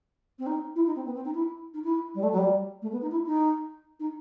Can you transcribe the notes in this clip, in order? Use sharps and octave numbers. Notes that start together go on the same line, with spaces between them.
C4
D#4
E4
D#4
C4
B3
C4
D#4
E4
D#4
E4
G3
A3
F#3
G3
A3
B3
D#4
E4
D#4
D#4